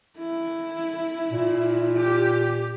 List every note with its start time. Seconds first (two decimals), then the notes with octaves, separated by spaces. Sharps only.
0.19 E4
1.32 A#2
1.97 G4